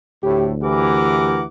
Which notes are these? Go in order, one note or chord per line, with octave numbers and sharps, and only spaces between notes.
D2 A2 G4
E3 G4 A#4 F#5 D6